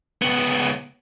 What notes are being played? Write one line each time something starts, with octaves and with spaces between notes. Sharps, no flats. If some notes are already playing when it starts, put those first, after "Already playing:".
C#2 B3